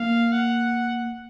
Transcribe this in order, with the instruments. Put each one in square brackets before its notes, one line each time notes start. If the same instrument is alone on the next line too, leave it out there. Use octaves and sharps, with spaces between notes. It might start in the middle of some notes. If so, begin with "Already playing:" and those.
Already playing: [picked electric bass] A#3 [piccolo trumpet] F5
[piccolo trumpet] F#5